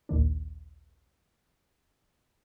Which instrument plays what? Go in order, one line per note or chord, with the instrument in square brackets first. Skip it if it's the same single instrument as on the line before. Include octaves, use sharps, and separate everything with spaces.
[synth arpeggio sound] A#1 D#2 D#3 D4